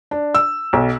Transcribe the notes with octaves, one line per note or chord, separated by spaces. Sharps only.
D4
E6
B1